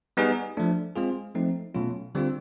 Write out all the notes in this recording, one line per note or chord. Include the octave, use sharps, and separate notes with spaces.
G3 B3 D#4 G#4
F3 A3 D4
G#3 C4 F4 G#4
F3 A3 C4 D#4
B2 F#3 A3 C#4 F4
D3 G3 C4 F4